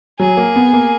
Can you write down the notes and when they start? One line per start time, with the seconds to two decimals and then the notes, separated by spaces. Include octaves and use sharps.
0.19 F#3 G#4
0.37 A#3
0.56 B3
0.73 A#3